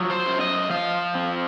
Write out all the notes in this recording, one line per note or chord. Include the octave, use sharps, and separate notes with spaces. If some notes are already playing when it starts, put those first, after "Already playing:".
Already playing: F3 F#3
C5
F#2
D#5
F3 F5
C4